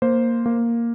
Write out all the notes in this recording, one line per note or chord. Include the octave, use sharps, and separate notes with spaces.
A#3 C5
A#3